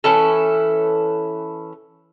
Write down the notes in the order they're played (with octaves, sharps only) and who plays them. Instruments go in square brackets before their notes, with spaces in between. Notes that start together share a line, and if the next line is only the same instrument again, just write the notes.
[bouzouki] E3 C#4 E4 A4